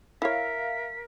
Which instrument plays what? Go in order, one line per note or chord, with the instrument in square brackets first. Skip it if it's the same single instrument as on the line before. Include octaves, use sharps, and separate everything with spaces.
[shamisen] E4 C#5 [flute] A#4 [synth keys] E5 F5 [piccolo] B6